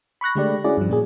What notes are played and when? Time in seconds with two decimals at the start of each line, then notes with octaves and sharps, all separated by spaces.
0.21 B5 C#6 F#6 A#6
0.35 D3 G#3 A3 G4 D5
0.64 C#4 E4 F#4 G#4 D5
0.77 G2 F3
0.90 A#2 A#3 G#4